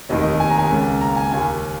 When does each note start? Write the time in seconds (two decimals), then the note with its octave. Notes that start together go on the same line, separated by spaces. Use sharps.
0.09 F1 D#2 D#3 D#5
0.20 D#5
0.40 G#5
0.50 A#5
0.59 G#5
0.70 C#2 C#3 A#3
1.01 A#5
1.16 G#5
1.32 D#2 D#3 A#3 G#5